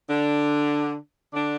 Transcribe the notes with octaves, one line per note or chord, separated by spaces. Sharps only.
D3 D4
D3 D4